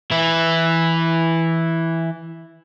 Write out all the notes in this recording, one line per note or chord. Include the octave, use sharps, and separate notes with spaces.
E3 E4